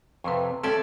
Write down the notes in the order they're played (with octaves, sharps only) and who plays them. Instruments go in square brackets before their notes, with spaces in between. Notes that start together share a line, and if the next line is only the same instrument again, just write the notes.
[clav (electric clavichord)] F2 C3 [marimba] B4 C6 C#6
[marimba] C4 [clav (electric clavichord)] C#4 E5 G5 [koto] A4 D5